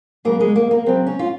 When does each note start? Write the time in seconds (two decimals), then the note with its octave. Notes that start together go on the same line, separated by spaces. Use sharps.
0.25 C#3 F#3 A#3
0.40 G#3
0.56 A#3
0.71 A#3
0.86 C#3 F#3 C4
1.07 C#4
1.19 F4